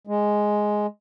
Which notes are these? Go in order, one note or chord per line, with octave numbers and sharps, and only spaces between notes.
G#3